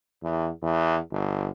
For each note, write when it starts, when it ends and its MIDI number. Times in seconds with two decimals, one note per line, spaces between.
0.23 0.48 40
0.62 0.97 40
1.11 1.48 31